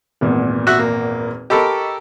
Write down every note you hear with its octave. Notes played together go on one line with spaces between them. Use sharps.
G#1 E2 A#2
F#4 E5 F#6
A#3
G4 A4 A#4 D#5 B5 C#6